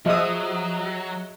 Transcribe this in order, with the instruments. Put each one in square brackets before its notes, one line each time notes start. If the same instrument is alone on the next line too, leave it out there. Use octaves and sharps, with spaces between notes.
[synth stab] F3 D#6 [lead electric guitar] F#3 [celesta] G#4 E5 [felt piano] D#5 E6